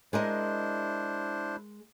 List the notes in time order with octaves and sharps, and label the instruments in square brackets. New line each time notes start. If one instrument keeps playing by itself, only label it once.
[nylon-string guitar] G#3 A#4 D#5 [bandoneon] D4 E4 C5